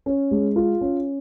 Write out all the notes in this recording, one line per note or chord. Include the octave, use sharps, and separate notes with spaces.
C#4
G#3
F4
C#4